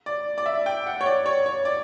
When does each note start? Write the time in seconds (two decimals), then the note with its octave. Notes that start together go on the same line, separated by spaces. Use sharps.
0.06 D5
0.38 D5
0.46 E5
0.66 G5
0.86 F#5
1.01 C#5
1.06 D5
1.26 C#5
1.46 C#5
1.65 D5